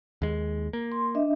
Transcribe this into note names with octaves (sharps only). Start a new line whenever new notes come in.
D#2 G#3
A#3
C6
D4 D#5 E5